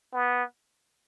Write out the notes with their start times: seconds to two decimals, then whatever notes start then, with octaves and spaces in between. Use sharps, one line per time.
0.14 B3